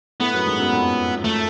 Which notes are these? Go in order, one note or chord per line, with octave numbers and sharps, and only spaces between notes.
A2 A3 B3
F#2 F#3
G#2 G#3
F#2 F#3
F2 F3
A3